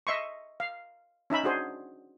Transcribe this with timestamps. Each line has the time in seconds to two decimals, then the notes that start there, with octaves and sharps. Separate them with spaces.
0.07 D#5 E5 C6 C#6
0.60 F5
1.30 C#4 D#4 E5 B5
1.43 D4 F#4 G#4 C5